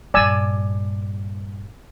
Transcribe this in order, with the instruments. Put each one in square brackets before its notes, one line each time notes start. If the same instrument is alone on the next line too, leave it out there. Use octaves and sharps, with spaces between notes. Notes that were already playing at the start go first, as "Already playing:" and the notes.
[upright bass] G2 A#2 [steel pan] D5 G#5 E6